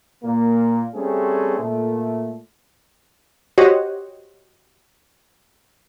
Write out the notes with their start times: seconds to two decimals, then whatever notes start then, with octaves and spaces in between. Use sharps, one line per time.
0.24 A#2 A#3
0.95 G3 A3 C4 C#4 G#4
1.58 A#2 A3
3.58 F#4 G4 C5 C#5 D#5 F#5